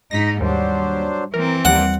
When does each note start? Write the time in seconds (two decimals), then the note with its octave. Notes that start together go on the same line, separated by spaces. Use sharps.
0.11 G#2 D#4 A#6 B6
0.41 D#2 F#3 G3 D4 C5
1.34 E3 C4 A#4
1.65 D#2 G3 A#3 F#5